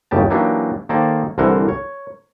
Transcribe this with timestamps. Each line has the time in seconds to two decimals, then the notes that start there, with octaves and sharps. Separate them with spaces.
0.11 G1 D#2 C#3 G4 A5
0.30 E3 F#3 A#3 D4 D#4 G4
0.89 D#3 A#3 A4 C5 D5
1.38 C2 D3 E3 A#4 C5 F#5
1.69 C#5